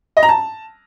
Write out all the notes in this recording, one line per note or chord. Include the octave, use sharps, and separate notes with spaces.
D#5
A#5
A5